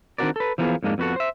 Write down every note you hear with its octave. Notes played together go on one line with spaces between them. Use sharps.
D#3 C4 D4 F#4 A#4 D5
A4 B4
E3 F3 A#3 B3 G#4
F2 G#2 G#3 A#3 D4
F2 B3 F#4 A4
C5 E5